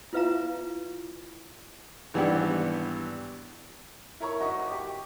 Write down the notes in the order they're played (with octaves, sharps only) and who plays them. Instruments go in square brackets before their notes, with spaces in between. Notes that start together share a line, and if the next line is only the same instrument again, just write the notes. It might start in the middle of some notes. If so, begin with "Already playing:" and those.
[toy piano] E4 F4 B4 E5 F5 A#5
[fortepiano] G#1 E3 G3 B3 D4 G4
[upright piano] E4 A#4 C#5 A#5 C#6
F#1 F#4 D#5 C#6
G4 C#6 D6